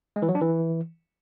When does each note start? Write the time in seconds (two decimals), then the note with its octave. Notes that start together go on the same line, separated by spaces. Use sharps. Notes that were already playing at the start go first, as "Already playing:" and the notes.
0.16 G#3
0.22 E3
0.29 F#3
0.35 D4
0.41 E3